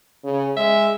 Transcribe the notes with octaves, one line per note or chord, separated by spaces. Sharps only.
C#3
G#3 E5